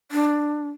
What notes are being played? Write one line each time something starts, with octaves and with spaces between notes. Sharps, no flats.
D4